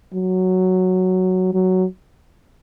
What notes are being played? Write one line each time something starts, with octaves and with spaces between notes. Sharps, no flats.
F#3
F#3